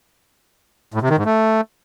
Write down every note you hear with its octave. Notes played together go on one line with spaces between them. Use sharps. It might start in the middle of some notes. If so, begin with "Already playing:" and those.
A2
C3
D#3
G#2
A3